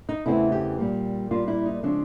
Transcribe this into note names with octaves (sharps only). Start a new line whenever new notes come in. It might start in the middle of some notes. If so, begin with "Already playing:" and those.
D#4
E2 C#3 E3 A3 C4 E4
G4
A#2 G3 A#3
A#2 G3 A#3 F4
E4
D#4
C#3 F3 G#3 C4 D4